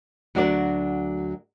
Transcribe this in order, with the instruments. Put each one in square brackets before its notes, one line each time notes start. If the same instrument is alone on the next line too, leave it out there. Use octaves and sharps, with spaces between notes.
[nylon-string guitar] D2 F#3 D4 F#4 A#4 D5